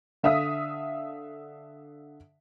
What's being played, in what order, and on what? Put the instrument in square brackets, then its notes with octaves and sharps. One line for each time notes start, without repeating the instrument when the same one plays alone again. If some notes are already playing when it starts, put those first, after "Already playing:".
[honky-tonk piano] D3 E5 F5 D#6 B6